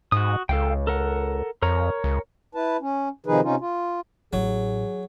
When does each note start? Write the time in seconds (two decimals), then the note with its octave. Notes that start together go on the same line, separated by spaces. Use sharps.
0.12 G#2 F#4 D#6
0.49 C#2 A4 F5 G5
0.87 A4 A#4 F#5
1.62 F2 A#4 C#5 A#5
2.04 C#2
2.55 E4 B4 A5
2.81 C#4
3.26 C3 D#3 F3 D#4 G#4 B4
3.43 C3 C#4 D#4 F4
3.60 F4
4.33 A1 F#3 G#4